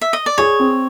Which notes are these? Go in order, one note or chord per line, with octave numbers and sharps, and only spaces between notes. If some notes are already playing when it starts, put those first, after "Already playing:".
E5
D#5
D5
G#4 C#5
C4